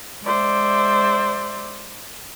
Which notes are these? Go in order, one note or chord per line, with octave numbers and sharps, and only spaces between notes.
G#3 C5 D5 E5